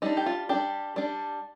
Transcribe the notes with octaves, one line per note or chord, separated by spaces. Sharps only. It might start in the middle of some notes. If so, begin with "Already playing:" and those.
G3 D4 D#4
G4
F4
G3 D4 G4
G3 D4